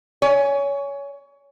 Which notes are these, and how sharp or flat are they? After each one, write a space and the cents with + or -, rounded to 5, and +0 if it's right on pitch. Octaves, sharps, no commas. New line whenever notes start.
C#5 +20 G#5 +0